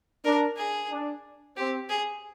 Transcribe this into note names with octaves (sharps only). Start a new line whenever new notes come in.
D4 A#4
G#4
D4
C4 G4
G#4